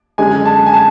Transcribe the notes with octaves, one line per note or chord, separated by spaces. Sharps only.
F#2 D3 G#3 G#5
A5
G#5
A5